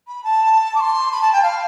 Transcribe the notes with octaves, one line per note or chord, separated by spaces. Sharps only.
B5
A5
D6
C6
B5
A5
G5
F5